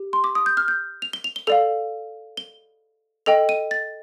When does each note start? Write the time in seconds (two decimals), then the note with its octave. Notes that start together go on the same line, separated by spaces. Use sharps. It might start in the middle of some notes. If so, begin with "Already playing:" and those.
Already playing: G4
0.13 C6
0.24 D6
0.35 D#6
0.46 G6
0.57 F6
0.68 G6
1.02 F7
1.13 G7
1.24 F7
1.36 G7
1.47 A4 D5 F5 F7
2.37 G7
3.26 A4 D#5 G5 F7
3.49 D#7
3.71 A6